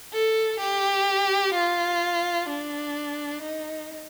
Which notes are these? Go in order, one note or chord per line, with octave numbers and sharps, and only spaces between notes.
A4
G4
F4
D4
D#4